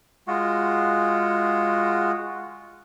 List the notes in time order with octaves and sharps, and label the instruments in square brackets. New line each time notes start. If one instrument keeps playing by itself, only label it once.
[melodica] G#3 F4 F#4 F#5